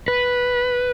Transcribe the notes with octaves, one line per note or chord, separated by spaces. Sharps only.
B4